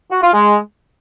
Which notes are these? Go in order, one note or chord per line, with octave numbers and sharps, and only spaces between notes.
F#4
F4
G#3